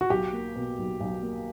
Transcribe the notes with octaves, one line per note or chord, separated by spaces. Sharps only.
F#4
B1 G4
A#3
B2
B1
B1
A#3